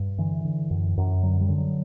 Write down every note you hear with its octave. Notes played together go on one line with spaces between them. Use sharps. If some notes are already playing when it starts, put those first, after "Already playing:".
Already playing: G2
D3 E3
D3
F#2
F#2
D3 F#3
G3
D3
F#3